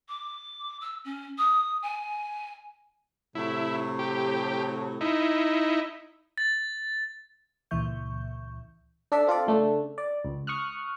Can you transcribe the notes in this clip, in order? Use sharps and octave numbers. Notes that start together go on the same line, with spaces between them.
D6
E6
C#4
D#6
G#5
A2 C3 F#3 E4
G4
D#4 E4
A6
C#2 A#2 E3 E5 C#6 G6
D4 A4 D5 E5
C4 F4 A4 D5
C#3 A3 D4
D5
C#2
C#6 D#6 F6 F#6